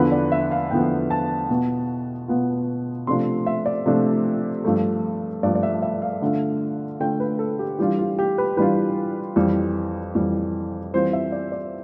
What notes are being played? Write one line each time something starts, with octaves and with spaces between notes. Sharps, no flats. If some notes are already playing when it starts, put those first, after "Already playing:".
Already playing: E2 D3 F3 B3 B4
D5
E5
F5
E2 D3 F3 B3 G5
A5
B2 B3 F4
B2 B3 F4
C3 F3 A3 D4 F4 C6
E5
D5
C3 F3 A3 D4 F4
G2 F3 A3
G2 F3 A3 D5
D5
E5
E5
F5
D3 A3 D4 F4
D3 A3 D4 F4 G5
B4
A4
G4
E3 G3 D4 F4 G4
F4
G4
B4
E3 G3 D4 F4 B4
F2 E3 G3
F2 E3 G3
E3 G3 C4 F4 C5
E5
D5
D5